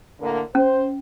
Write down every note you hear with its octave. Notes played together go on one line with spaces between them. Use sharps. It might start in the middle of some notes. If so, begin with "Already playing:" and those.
A2 D3 A#3
C#4 C5